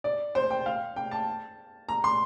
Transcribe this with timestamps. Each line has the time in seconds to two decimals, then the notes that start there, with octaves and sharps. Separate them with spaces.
0.04 D5
0.35 C5
0.50 G5
0.66 F5
0.96 G5
1.11 A5
1.89 A#5
2.04 C6